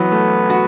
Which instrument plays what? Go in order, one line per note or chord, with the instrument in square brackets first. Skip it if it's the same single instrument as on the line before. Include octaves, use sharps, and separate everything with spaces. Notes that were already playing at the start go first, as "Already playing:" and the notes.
Already playing: [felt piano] E3 F#3 [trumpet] B3
[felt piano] A3
F#4